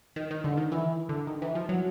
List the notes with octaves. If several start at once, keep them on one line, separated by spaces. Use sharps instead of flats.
D#3
D#3
D3
D#3
E3
D3
D#3
E3
F3
F#3